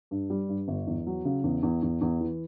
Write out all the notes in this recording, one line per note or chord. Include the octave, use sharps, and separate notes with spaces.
G2
G3
G2
G1
E2
F#3
C#3
E2
E2
E2
E2
E3